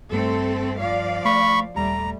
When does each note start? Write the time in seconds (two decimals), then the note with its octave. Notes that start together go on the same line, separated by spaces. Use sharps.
0.12 G2 A3 C4 A4
0.80 F3 D5 F5
1.25 A3 B5 C#6
1.77 D#1 G3 A3 A#5